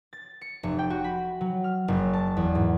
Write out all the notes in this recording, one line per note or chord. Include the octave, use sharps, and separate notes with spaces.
A6
C#7
F1
G5
F#4
B5
F#3
F6
F#1
A5
E2
G#2